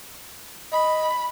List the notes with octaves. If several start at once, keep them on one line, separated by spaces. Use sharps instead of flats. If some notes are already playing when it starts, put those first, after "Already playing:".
D#5 B5